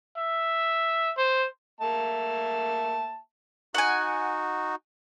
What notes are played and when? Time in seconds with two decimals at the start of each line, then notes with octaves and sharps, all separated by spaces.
0.18 E5
1.17 C5
1.81 A#3 E5 A5
3.75 D#4 F#4 F#5 G#5